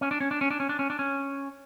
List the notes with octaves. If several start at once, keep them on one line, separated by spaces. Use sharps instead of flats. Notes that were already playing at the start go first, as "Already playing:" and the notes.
C#4
D4
C#4
D4
C#4
D4
C#4
D4
C#4
D4
C#4